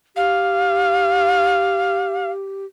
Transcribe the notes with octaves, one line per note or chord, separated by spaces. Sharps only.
G4 F5